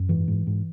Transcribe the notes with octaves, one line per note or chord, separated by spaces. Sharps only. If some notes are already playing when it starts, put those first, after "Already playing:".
Already playing: F#2
G#2 E3
G#2
G#2